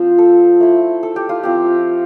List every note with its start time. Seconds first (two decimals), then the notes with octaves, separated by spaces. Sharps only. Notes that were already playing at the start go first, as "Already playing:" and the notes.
Already playing: F3 C4 F4 C5
0.18 A4
0.60 A3 E4
1.03 A4
1.16 G4
1.29 F4
1.43 F3 C4 F4 G4